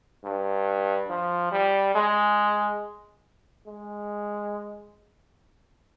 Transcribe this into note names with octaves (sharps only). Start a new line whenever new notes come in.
G2
F3
G3
G#3
G#3